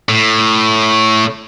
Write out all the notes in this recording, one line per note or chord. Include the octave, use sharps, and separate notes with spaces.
A2